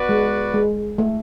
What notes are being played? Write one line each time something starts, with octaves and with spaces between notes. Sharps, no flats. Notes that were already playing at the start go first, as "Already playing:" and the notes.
Already playing: B3 F#4 B4 D5
G#3
G#3
A3